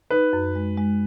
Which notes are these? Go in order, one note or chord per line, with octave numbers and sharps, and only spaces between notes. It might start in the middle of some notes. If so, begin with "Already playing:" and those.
D#4 B4
F#2
G#3
G#3